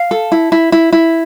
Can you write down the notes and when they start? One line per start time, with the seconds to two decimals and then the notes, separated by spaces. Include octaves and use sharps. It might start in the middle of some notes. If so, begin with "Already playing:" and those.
Already playing: F5
0.11 A4
0.32 E4
0.52 E4
0.72 E4
0.93 E4